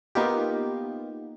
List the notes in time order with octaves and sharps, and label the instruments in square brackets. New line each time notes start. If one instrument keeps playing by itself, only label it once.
[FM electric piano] A#3 B3 D#4 F4 G4